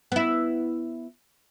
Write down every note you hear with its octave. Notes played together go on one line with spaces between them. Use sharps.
B3 E4